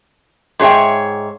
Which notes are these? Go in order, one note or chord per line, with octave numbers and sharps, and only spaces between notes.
G#2 G#4 C#5 E5 G5